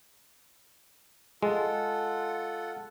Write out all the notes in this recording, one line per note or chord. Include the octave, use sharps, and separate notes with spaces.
G#3 F4 A4 F#5